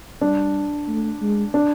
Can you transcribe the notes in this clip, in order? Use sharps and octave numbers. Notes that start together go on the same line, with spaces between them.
G3 D4
A3
G#3
D4